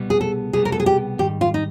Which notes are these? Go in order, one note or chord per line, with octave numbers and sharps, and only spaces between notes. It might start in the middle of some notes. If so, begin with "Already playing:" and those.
Already playing: C2 B2 G3 B3
G#4
A4
C2 B2 G3 B3 G#4
A#4
A4
G#4
G4
G#2 D#3 G3 G4
F4
D#4